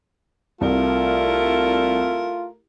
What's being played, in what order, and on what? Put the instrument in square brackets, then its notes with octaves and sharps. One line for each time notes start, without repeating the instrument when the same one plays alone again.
[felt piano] C2 [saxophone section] A3 E4 A#4 [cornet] F4